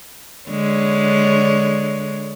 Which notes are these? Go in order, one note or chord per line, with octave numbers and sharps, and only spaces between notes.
D3 G#3 C#5